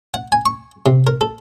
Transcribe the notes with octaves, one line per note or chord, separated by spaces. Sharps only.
F#5
G#5
C#6
C3
A#4
A4